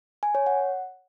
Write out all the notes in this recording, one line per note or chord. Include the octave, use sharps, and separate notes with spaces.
G#5
C#5
F#5